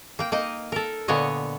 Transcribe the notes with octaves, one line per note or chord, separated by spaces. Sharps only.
A#3 G5
A#3 D#4 D#5
A4 A#4
A#2 D3 B3 C#5 D#5